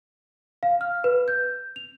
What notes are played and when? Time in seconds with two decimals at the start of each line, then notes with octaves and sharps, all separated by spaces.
0.63 F5
0.81 F6
1.04 B4
1.28 G6
1.76 F7